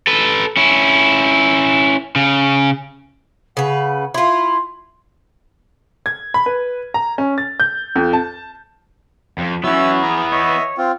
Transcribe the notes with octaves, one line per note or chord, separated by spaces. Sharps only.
A4 B4
C#4 E4
C#3
C#3 B4 F#5
E4 F4 C6
G#6
B5
B4
A#5
C#4
A6
G6
F2
A5
F2
E3 F#3 B3 C#4 E4 E6
G#4 A#5
C#5 D#5 E5
C4 F4